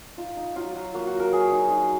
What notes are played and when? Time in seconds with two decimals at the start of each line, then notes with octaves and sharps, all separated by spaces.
0.18 D#4 F4
0.37 D#4
0.56 F#3 F4
0.75 F#3
0.94 A#3 F#4
1.07 F#4
1.13 F#3
1.20 A#4
1.32 F#3 G#4
1.52 D#4
1.71 D#4